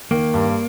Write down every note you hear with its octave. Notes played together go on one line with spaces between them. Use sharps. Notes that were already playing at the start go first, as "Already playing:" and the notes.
D#3 A#3
G2